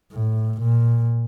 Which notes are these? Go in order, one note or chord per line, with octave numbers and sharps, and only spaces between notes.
A2
A#2